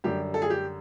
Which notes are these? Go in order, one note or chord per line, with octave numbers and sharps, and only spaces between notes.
F#2 D3 G3 G4
A4
G#4
G4